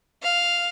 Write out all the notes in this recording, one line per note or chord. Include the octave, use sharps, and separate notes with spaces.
F5